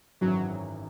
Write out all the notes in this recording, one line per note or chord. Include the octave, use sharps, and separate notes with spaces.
G#1 F#2 E3 F#3